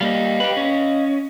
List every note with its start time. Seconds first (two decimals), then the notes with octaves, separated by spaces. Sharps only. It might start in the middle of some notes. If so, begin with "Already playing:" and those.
0.01 G3 A#3 D#5 F5
0.40 G4 B4
0.57 C#4